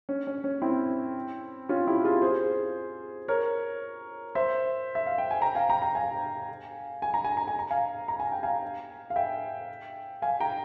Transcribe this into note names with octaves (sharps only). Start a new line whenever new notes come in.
C#4
C#4
C#4
C4 E4
C#4 F4
E4 G4
F4 G#4
G#4 C5
A#4 C#5
C5 E5
E5
F5
G5
G#5
G5 A#5
F5 G#5
G5 A#5
G5 A#5
F5 G#5
G#5
A#5
G#5
A#5
G#5
A#5
F5 G#5
A#5
G#5
G5
F5 G#5
F5
E5 G5
F5 G#5
G5 A#5